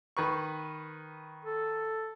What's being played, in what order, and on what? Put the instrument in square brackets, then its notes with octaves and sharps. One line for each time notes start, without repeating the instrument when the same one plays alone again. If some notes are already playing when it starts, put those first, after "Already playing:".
[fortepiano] D#3 B4 C#6
[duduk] A4